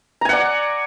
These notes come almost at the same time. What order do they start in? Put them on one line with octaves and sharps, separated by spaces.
A#5 G#5 F#5 D5